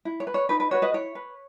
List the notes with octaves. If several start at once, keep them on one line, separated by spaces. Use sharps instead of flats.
E4
C#5
B4
C#5
D#4 B4
B4
F#4 B4 C#5
B4 D#5
E4 C#5
B4